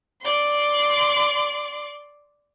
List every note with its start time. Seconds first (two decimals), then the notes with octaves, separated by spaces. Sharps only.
0.22 D5 C6